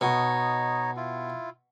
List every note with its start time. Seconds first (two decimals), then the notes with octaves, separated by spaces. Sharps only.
0.01 B2 D#4 C#5 D#5
0.97 E4 F4